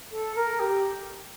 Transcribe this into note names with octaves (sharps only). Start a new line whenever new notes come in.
A4
A#4
G4